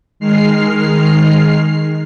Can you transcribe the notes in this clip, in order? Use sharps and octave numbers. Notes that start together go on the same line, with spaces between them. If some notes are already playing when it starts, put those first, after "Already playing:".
D#3 G#3 F6 C7